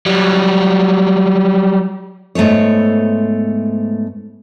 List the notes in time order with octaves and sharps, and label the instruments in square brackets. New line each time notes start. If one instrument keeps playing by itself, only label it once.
[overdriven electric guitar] F#3 G3
[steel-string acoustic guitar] G#2 A3 B3 C5 C#5